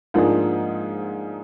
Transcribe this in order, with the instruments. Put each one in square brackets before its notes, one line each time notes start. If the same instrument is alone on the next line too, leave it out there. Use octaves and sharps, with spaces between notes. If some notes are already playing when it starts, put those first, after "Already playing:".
[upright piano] G#2 F3 A#3 D4 G#4